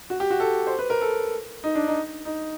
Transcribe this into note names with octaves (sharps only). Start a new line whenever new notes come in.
F#4
G4
F#4
A4
C5
B4
A#4
A4
D#4
D4
D#4
D#4